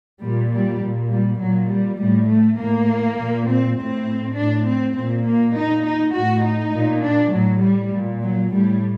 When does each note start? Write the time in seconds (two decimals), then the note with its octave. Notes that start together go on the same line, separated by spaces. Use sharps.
0.22 A#2 G3
0.53 G3
0.82 A#2
1.11 G3
1.40 A#2 F#3
1.70 G3
2.00 A2 G3
2.29 A3
2.59 A2 A#3
3.18 A#2
3.49 C4
3.78 A2 C4
4.37 A2 D4
4.67 C4
4.96 A#2 C4
5.26 A#3
5.56 A#2 D#4
5.86 D#4
6.15 A2 F#4
6.44 D#4
6.74 A#2
7.04 D4
7.33 A2 F#3
7.63 G3
7.93 A#2
8.23 F#3
8.52 A2 G3